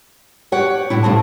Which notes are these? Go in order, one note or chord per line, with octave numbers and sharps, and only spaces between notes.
G4 C#5 F#5
A2 C3 E4
D#2 A2 C4 A5